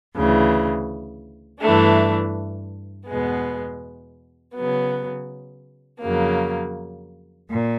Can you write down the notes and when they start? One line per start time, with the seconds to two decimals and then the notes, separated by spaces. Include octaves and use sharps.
0.13 D2 C#3 E3
1.61 G2 E3 A3 D4
3.08 E2 B2 G#3 B3
4.55 C#3 F#3 B3
6.01 F2 C#3 F#3 A#3
7.49 A#2